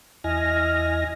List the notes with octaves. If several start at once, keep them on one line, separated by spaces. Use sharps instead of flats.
E2 E4 D#5 G#5 F6 A#6